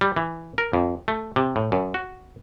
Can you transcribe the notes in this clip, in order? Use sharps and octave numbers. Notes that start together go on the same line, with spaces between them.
G3
E3
A#4
F2
A3
C3
A2
F#2
F#4